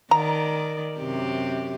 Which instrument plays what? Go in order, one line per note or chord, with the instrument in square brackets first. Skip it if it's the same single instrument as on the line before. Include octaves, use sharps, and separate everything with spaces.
[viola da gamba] D#3 D5 [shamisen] A#5
[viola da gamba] F#2 C3 G4